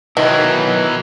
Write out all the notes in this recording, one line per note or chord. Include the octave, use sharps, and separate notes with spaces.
B2 D#3 F#3 E4 B4